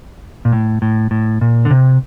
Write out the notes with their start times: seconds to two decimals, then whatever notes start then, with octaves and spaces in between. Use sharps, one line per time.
0.45 A#2
0.52 A2
0.82 A2
1.11 A2
1.41 A#2
1.65 D3
1.70 C3